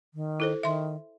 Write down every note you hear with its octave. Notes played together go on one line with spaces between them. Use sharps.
D#3
E4 A4 C5
D#3 E5 C6